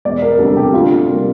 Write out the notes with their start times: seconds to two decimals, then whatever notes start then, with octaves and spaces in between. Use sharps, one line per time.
0.05 E1 D5
0.22 A#4
0.38 D2 C3 G3 A4
0.57 G4
0.73 D2 F4
1.07 C3 G3 A#3